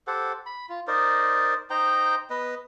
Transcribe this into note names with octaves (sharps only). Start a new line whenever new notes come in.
G4 A4 C5 F#5
B5
F4
D#4 A#4 C5 D5
D#4 C5 G5 A#5
B3 B4 D#5